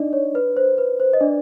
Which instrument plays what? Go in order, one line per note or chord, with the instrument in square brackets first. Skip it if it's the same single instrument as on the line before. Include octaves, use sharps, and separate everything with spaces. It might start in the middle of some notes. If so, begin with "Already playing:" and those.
Already playing: [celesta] D4 D#4 D5 D#5
C#5
B4
C5
B4
C5
D#5
D4 D5